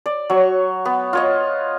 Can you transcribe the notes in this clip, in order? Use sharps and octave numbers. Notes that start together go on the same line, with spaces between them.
D5
F#3 C#6
B3
F4 C#5 D#5